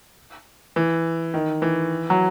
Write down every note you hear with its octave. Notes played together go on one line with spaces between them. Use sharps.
E3
D#3
E3
F#3